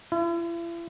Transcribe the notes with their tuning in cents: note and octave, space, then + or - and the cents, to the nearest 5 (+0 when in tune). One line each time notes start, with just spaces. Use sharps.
E4 +40